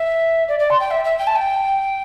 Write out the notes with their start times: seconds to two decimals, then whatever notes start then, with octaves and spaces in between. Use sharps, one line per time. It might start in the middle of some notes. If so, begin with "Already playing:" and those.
Already playing: E5
0.48 D5
0.59 D5
0.70 C6
0.79 G5
0.90 E5
1.04 E5
1.18 G5
1.27 A5
1.35 G5